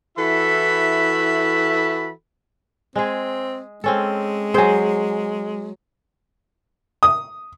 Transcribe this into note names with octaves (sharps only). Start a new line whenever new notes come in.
E3 E4 F#4 A4 E5 B5
G#3 C4 G#4
G#3 C4 C#4 A4
F#3 G#4 C5 G#5
D#6